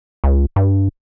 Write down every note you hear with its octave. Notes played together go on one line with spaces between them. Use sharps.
C#2
G2